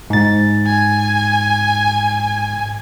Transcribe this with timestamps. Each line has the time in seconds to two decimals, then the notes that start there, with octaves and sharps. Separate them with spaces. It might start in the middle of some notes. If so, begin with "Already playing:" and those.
0.10 G#2 A6
0.67 G#5